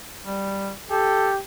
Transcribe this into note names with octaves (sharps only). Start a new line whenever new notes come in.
G3
G4 A4